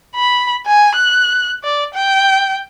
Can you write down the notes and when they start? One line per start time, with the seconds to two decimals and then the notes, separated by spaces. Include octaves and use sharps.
0.16 B5
0.67 G#5
0.95 F#6
1.64 D5
1.94 G5